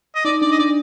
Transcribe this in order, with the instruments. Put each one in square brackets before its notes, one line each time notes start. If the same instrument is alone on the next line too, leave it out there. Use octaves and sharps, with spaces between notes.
[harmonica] D#5
[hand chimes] D#4 [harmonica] D5
[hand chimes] D4 [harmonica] D5
[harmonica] D#5
[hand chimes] D4 [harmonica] D5